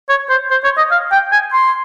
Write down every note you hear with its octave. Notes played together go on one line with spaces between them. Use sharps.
C#5
C5
C5
C#5
D#5
F5
G5
G#5
C6